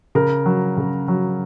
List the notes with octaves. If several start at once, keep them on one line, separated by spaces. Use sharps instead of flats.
C#3 A#4
F#3
C#3
F#3